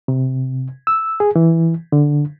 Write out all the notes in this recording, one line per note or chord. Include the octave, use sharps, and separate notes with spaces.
C3
E6
G#4
E3
D3